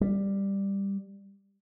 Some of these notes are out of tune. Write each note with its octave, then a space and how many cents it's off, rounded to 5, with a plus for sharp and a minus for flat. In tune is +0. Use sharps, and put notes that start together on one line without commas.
G3 +10